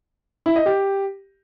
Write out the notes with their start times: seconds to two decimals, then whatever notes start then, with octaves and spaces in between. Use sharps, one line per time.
0.46 E4
0.56 D#5
0.66 G4